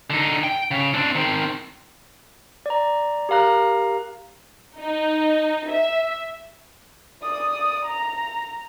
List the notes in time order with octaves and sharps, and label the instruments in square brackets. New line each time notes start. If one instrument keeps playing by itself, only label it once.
[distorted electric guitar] D3 D#4
G5
C#3
C4 D4
D#3 C4
[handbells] D5 A#5
G4 A#4 F5 A#5 F#6
[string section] D#4
E5
[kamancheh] D5 D#6
A#5